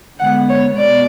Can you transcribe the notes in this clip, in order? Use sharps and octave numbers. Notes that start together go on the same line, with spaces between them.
D3 G#3 B3 F#5
C#5
B2 D5